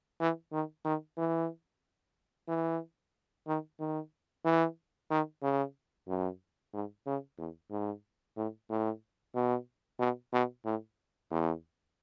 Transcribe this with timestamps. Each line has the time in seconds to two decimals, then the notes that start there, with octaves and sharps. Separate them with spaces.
0.20 E3
0.52 D#3
0.85 D#3
1.18 E3
2.48 E3
3.47 D#3
3.79 D#3
4.45 E3
5.11 D#3
5.42 C#3
6.08 F#2
6.74 G#2
7.07 C#3
7.38 E2
7.71 G#2
8.37 A2
8.70 A2
9.35 B2
10.00 B2
10.33 B2
10.65 A2
11.31 E2